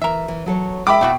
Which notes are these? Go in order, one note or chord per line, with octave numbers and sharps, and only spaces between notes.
E3 A#4 E5
E3
F#3 A4 C#5
G#3 E5 G5 B5 D6
B2 A3 E4 F#4